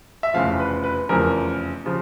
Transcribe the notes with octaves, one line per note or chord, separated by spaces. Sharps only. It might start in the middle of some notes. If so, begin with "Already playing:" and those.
E5
F1 E2 C#3 F3 F5
B4
B4
F1 E2 C#3 F3 A#4
C#3 F3